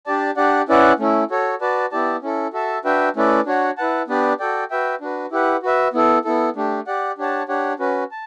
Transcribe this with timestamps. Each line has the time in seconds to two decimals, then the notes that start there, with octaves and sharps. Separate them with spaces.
0.06 D4 G4 D5 A5
0.37 D4 G4 D5 F#5
0.69 C#4 E4 B4 D5 F#5
0.99 A3 C#4 E4
1.30 F#4 A4 C#5
1.61 F#4 B4 D5 A5
1.92 B3 E4 G4 D5 A5
2.22 C#4 E4 A4
2.53 F#4 A4 E5 A5
2.85 D4 F#4 B4 E5 G5
3.16 A3 C#4 E4 B4 D5
3.46 D4 F#4 C#5 F#5
3.77 E4 B4 F#5 A5
4.08 B3 D4 G4 B4 D5
4.40 F#4 A4 D5 G5
4.70 F#4 B4 E5 G5
5.01 D4 F#4 B4
5.32 E4 G4 B4 F#5
5.63 F#4 B4 E5
5.93 B3 E4 A4
6.24 B3 E4 A4
6.56 A3 D4 G4
6.87 G4 D5 F#5
7.18 D4 G4 C#5 F#5 A5
7.48 D4 G4 C#5 F#5
7.79 C#4 F#4 B4
8.11 A5